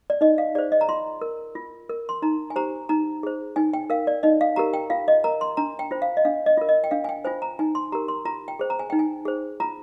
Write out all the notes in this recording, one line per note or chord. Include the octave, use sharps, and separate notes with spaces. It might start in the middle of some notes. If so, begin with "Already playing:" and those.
D5
D#4 D#5
F5
G#4 C5 D5
D#5
A#5
F4 C6
A#4
F4
A#4
C6
D#4 A#5
G#5
G4 C5 A#5
D#4 A#5
G#4 C5
D#4 G#5
G5
A#4 F5
D5
D#4 D#5
F5
G4 A#4 A#5
G5
F4 F5
D#5
A#4 A#5
C6
D4 A#5
G5
F4 C5
F5
D#5
D4 F5
D#5
F4 A#4
D#5
G5
D4 F5
G#5
G5
F4 C5 G#5
A#5
D#4 G#5
C6
G4 A#4 A#5
C6
F4 A#5
G5
G#4 C5
A#5
G#5
D#4 G5
G#5
G#4 C5
F4 A#5